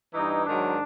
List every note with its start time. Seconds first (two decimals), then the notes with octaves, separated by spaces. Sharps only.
0.14 G2 E3 D#4
0.45 G#2 D#3 F#3 D4